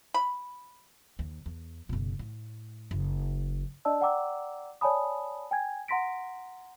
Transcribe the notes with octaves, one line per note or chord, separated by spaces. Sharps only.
B5
D#2
E2
F#1 B2
A2
F#1
D4 D5 D#5 A5 E6
D5 F#5 G5 A#5 D6 E6
C#5 D5 G#5 A5 B5 D#6
G5 G#5 G#6
F#5 A#5 C6 A#6 B6 D7